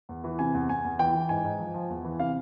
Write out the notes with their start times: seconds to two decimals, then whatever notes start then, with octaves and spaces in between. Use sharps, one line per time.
0.09 E2
0.24 E3
0.39 C3 G#5
0.54 E2
0.69 E2 G#5
0.85 E2
0.99 E3 G5
1.15 E3
1.29 G#2 G#5
1.44 G#2
1.59 F3
1.74 F3
1.90 E2
2.04 E3
2.19 C3 F5